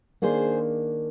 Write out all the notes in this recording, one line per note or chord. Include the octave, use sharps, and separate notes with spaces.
D#3 A#3 D4 G#4 C5